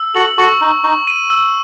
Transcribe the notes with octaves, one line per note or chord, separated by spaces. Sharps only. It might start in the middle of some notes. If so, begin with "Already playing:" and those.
Already playing: E6
F#4 A4 F#7
F#4 A4 C#6
D#4 C#6
D#4 C#6
D#7
E6